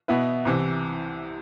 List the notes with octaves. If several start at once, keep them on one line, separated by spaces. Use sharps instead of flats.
B2 B3 E4 B4
C2 C3 E3